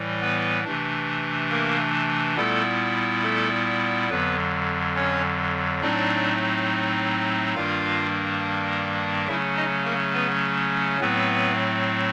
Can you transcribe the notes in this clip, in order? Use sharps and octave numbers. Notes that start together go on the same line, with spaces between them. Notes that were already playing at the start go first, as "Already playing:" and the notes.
Already playing: A2 E3 G3
B3 B4
C3 E3 A3 D4
A#3 A#4
A#2 G3 A3 B3 E4 A4
A3 A4
F2 D3 F#3 B3 B4
C#4 C#5
A2 F#3 A3 C4 D4 D#4 D5
G2 D#3 G3 A#3 D4 F4 F5
C#3 F#3 A3 C#4 E4 E5
D#4 D#5
A#3 A#4
B3 B4
A2 F#3 A3 B3 C4 B4